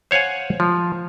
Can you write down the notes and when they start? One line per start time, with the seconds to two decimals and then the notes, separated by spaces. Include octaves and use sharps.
0.11 C5 C#5 F5 F#5 G#5
0.60 F3